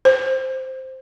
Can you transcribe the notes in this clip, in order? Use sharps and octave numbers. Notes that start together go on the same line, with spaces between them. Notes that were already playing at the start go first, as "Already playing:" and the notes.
C5